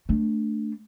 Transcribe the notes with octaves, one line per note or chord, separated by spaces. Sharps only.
A3 D4